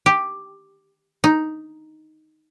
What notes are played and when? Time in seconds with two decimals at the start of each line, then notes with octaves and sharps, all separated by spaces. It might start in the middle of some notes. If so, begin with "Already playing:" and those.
0.06 G4
1.24 D#4